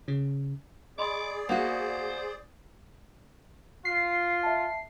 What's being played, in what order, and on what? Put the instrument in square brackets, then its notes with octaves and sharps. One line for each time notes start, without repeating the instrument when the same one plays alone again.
[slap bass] C#3
[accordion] G#4 D5 [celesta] D#5 B5 C6 [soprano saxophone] D6
[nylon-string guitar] A#3 F#4 [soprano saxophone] C5 [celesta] F#5 D#6 G6
[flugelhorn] F4 [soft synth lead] C7
[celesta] E5 A5